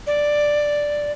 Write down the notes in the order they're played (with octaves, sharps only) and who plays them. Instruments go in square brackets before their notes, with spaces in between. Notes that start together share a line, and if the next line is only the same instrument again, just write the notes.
[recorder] D5